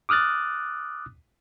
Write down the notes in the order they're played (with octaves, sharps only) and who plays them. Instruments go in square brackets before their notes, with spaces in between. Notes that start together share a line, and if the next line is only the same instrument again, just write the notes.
[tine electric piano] D6 D#6 F6 F#6 A6